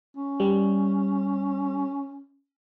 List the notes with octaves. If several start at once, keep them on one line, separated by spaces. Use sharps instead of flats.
C#4
G3